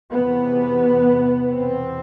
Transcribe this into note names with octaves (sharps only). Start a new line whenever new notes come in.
E2 C3 B3
E2 B2 C4